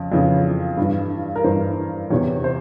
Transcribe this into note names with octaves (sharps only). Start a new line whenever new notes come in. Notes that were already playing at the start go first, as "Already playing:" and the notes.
Already playing: F2 C#3
F2 C#3 E3
G2 E3
A#4
G2 E3 C5
E2 C3 E3 C#5
C5